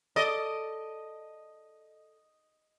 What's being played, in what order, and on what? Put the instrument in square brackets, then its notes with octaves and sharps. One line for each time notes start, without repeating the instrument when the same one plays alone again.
[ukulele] A4 D5 [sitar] D#5